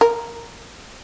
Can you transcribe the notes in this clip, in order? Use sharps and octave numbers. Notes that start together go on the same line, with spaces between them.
A#4